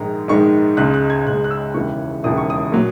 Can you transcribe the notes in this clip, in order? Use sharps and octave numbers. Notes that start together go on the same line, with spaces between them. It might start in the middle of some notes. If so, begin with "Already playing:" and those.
Already playing: A#1 G#2 D#3 G#3 A#5
A#1 G#2 D#3 G#3 C#6
C#2 C#3 G#3 F#6
F#6
G#6
C#2 C#3 G#3 F#6
F#6
E6
E1 D#2 C#3 E3 C#6
E1 D#2 C#3 E3 D#6
C#6
D#6
A#2 F#3